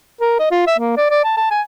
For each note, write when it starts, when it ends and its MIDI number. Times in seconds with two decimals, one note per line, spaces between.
0.21 0.35 70
0.39 0.48 75
0.51 0.63 65
0.67 0.74 76
0.78 0.97 58
0.97 1.07 74
1.10 1.24 74
1.24 1.34 81
1.37 1.47 81
1.51 1.61 80